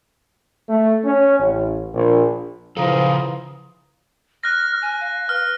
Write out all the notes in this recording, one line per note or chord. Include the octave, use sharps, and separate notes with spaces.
A3
C#4
A1
A#1
C#3 E3 F3 A4 F5 A#5 D#6
F6 F#6 A#6
G#5
F5
B4 F6